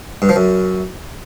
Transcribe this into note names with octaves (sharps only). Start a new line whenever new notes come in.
G2
F3
F#2